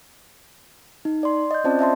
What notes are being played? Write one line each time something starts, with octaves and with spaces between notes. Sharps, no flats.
D#4
D5 C6
D#5 G6
C4 C#4 F4 C5 D5 A5
D#5 E5 A5 C6